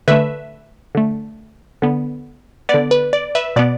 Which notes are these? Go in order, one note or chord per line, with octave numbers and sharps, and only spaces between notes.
D3 A3 B4 E5
D3 A3
D3 B3
B3 D5
D3
B4
D5
B4 E5
B2 B3 D5